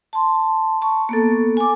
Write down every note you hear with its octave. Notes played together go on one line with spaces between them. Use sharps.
A5 C6
A5 C#6
A#3 B3 A4
G#5 D6